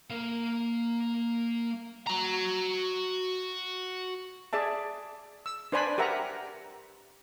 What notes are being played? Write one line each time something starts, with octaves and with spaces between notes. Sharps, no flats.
A#3 F5
F#4 A#5
G#4 D5 E5 A5
E6
D4 B4 C5 D5 G#5 B5
G4 A#4 E5 F#5 A#5